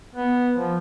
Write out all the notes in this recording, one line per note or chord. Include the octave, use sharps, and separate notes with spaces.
B3
F3